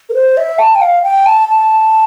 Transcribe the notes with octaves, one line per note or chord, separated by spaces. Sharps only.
A#4
C5
E5
A5
G5
F5
G5
A5
A5